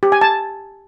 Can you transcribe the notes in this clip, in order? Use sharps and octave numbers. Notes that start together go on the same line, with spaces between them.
G4
G#5
A5